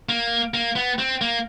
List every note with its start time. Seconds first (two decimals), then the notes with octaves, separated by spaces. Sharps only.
0.09 A#3
0.54 A#3
0.76 B3
0.99 C4
1.21 A#3